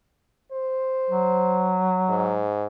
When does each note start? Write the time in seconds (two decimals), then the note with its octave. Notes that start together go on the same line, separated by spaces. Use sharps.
0.52 C5
1.10 F#3
2.09 G#2